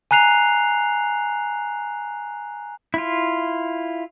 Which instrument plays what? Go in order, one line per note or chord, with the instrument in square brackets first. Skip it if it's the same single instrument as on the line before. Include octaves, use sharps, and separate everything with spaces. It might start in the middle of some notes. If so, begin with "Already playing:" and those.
[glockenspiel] G#5 A#5 F#6 C7 F7
[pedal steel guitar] E4 F4